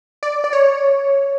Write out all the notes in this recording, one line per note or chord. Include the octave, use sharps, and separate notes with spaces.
D5
D5
C#5